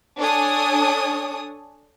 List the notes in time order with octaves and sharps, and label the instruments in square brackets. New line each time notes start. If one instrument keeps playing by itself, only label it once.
[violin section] D4 A4 C#5 G#5 D#6